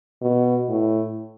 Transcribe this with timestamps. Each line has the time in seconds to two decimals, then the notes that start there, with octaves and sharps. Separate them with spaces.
0.22 B2
0.68 A2